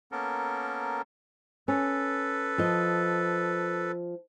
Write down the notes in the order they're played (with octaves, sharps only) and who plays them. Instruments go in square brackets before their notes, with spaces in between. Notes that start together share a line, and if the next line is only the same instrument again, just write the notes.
[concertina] A#3 B3 C#4 A4 A#4
[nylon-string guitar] C#4 [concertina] A4 B4
[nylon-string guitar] F3 D#5